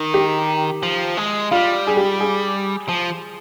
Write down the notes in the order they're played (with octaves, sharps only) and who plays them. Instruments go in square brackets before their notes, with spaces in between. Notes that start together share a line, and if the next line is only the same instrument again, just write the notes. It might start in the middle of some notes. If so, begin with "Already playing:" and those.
Already playing: [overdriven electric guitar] D#3
[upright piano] G4
[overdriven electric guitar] F3
G#3
[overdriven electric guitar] G3 [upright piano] F4
[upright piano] G#4
G4
G#4
[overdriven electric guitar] F3